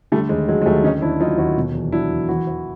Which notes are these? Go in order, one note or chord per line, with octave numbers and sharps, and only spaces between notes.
D3 G3 A3
D#2 G#3
F#3 G#3
G#3
D#2 G3 A3
D3 C#4 D#4
D#2 D4 E4
F#3 D#4 F4
D#2 E4 F#4
B2
E2
F#3 D4 E4
E2
E3 E4 F#4
E3